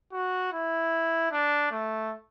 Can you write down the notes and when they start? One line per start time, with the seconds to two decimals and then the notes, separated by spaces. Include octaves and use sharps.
0.13 F#4
0.52 E4
1.32 D4
1.71 A3